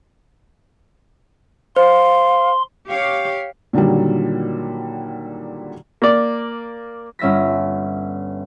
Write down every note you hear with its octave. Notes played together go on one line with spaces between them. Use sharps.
C5 F5 C6
G4 C#5 F5
A#2 D3 D#3 F#3 G3
A#3 D5
G1 C#4 E5 A#6 B6